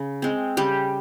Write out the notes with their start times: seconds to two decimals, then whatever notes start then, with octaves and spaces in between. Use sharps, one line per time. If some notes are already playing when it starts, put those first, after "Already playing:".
Already playing: C#3
0.22 G#3 C4
0.57 C#3 G3 G4